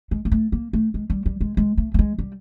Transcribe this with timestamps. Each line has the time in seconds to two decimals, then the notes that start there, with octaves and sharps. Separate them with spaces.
0.11 G#3
0.25 A#3
0.32 A3
0.52 A#3
0.73 A3
0.94 G#3
1.10 G3
1.26 G3
1.41 G#3
1.57 G#3
1.77 A3
1.94 A3
1.99 G#3
2.18 G3